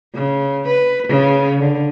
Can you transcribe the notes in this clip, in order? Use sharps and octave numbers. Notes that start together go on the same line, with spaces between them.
C#3
B4
C#3
D3